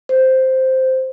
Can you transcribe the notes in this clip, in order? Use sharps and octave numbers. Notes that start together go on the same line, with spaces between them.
C5